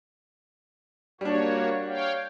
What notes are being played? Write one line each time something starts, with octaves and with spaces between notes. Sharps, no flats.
G3 A#3 D4 F#4 C#5
C#5 F5 G5